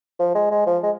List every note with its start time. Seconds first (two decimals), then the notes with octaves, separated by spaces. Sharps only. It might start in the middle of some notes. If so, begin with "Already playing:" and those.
0.19 F3
0.35 G#3
0.51 G#3
0.66 F3
0.83 G#3